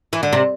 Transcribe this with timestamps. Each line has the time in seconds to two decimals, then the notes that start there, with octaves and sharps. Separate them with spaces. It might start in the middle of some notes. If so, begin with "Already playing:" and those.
0.13 E3
0.23 D3
0.33 C3